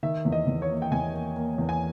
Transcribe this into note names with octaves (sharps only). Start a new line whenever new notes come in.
D#3 E5
E2
D#5
E2
C#5
A#3
G5
E2 G#5
A#3
A#3
E2
G#5